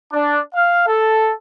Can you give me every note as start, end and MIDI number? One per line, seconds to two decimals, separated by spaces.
0.12 0.38 62
0.55 0.86 77
0.87 1.30 69